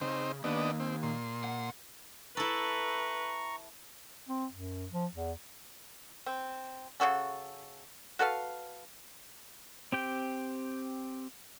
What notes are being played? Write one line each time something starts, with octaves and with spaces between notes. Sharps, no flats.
C#3 C4 D#4 C5
D#2 B3 D4 D#5
C4
A#2 C6
F#5
E4 A4 B4 A#5 C#6
C4
F#2
F3
E2
C4
C#3 F#3 F#4 A4
F#4 A4 B4 F5
C4 G4 G5